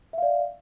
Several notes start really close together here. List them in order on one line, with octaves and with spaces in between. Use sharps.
E5 F5 D5